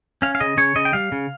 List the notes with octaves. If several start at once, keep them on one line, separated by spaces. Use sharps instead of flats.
C#4 F5
F5
C#3 D#5
C#3 C#5
C#3 D#5
G5
G3 F5
C#3